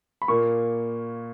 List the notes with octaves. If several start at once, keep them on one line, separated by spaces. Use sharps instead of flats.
B5
A#2 A#3 C#6